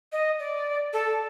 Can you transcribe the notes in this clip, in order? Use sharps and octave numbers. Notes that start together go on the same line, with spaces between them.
D#5
D5
A4